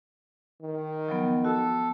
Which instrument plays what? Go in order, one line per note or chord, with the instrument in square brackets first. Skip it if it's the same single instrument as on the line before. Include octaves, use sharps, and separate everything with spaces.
[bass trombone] D#3
[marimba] F3 F#3 B3
[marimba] F#4 [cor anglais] A4